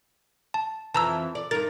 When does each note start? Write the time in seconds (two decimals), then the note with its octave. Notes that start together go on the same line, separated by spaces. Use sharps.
0.54 A5
0.94 F2 E3 A5 A#5 E6
1.35 D5
1.51 G2 D#4 A#4 A6